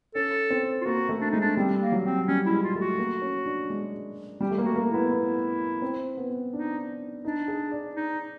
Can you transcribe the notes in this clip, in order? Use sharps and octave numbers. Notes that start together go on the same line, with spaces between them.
C#4 A4
C4
F4
A#3 F#4
A3
D4
G#3 D#4
D4
G3 C4
A#3
F#3
C4
G3 C#4
E4
G#3
F4
A3
F#4
A#3
C#4
D4
G#3
G3 G4
A3
A#3
F#4
A#3
E4
B3
B3
C4
B3
D4 D#4
D4 D#4
G#4
D5
D#4